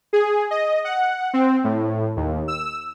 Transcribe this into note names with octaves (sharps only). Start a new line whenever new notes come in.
G#4
D#5
F#5
C4
A2
D#2
E6